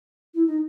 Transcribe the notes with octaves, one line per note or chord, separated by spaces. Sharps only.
E4
D#4